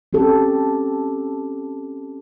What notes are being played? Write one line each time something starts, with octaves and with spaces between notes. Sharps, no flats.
C4 C#4 G4 A4